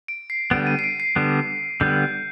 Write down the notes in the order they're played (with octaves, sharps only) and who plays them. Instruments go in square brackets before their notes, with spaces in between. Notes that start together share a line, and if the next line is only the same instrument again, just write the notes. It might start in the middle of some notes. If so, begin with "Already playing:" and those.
[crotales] D7
C7
[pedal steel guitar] D3 G3 B3 [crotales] D7
[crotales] D#7
C7
D7
C7
[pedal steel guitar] D3 G3 B3
[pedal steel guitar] D3 G3 B3 [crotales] G6